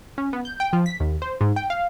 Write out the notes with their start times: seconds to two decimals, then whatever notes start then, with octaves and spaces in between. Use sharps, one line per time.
0.18 C#4
0.33 B3
0.45 G6
0.60 G5
0.73 F3
0.86 B6
1.00 D#2
1.22 C5
1.41 G#2
1.56 G5
1.70 F5